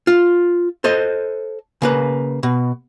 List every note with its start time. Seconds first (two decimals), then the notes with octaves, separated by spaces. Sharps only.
0.07 F4
0.84 A4 C5 D#5
1.82 C#3 A#3 B4
2.43 B2